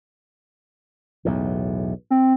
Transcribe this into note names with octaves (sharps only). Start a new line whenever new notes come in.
B1 E2 A2
C4